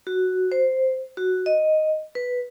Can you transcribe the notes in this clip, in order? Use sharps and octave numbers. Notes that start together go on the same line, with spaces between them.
F#4
C5
F#4
D#5
B4